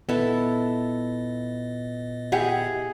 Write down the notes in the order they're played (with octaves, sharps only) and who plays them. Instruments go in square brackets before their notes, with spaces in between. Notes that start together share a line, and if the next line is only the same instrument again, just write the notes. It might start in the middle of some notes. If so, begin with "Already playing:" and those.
[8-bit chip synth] A#2 D#5 [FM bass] B3 [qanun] E4 A4
[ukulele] E4 G4 F#5 [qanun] G#4